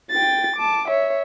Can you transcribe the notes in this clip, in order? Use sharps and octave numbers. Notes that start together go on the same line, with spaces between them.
G5 A6
A5 D6
C#5 E5